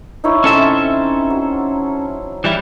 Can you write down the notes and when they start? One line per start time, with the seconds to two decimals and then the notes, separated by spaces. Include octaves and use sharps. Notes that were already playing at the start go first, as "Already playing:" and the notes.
0.24 D#4 E4 C#5
0.44 C3 C#4 A4 E5 G#5 C6
1.30 F#3
2.44 E3 G3 E4